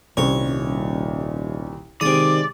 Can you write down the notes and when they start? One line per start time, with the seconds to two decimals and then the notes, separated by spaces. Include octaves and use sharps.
0.17 D#1 C2 C#4 C5 C#5
2.01 C3 D#3 G#3 D5 D#6